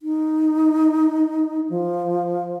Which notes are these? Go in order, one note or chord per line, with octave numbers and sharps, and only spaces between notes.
D#4
F3